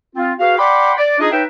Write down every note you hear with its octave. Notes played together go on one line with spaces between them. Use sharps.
C4 F4
F#4 G#4 B4 F5
D5 F#5 G5 B5 C6 D6
D5
D4 D#4 F4 G#4 D#5
D#4 B4 C#5 E5 G5